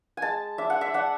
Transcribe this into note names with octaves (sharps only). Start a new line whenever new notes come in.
G#3 G#5 A5
D4 E5
F#5
E5
D4 F#5